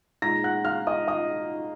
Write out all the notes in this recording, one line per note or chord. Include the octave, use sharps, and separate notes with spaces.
A#2 G#3 D#4 A#5 A#6
F#5 F#6
F5 F6
D#5 D#6
D#5 D#6